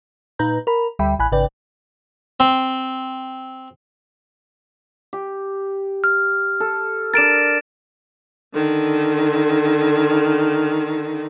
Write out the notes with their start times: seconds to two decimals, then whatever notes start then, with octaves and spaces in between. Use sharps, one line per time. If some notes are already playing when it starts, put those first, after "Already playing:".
0.39 A#2 D#4 B4 A#5 G6
0.67 A#4 A#5 B5
0.99 D2 G3 E5 G5 B5
1.19 A1 G#5 B5 F#6
1.32 G#1 C#3 B4 D5 G5
2.40 C4
5.13 G4
6.04 F6
6.60 A4
7.14 D4 A#4 A6 D7 E7
8.54 D3 D#3